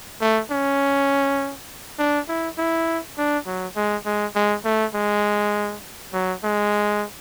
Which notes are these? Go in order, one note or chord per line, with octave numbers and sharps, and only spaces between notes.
A3
C#4
D4
E4
E4
D4
F#3
G#3
G#3
G#3
A3
G#3
F#3
G#3